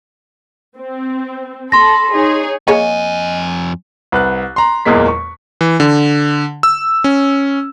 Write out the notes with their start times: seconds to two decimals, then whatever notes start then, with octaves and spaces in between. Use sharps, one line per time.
0.77 C4
1.72 A4 B5 C6 A#6
2.13 D#4 G#4 C#5
2.68 F2 A#3 G#4 C#5 D#5 G#5
4.12 C2 B4 F#5 F#6
4.56 A#5 C6
4.85 F#1 E2 A#2 G#3 A#3 B6
5.08 C#6
5.61 E3
5.80 D3
6.63 E6
7.04 C#4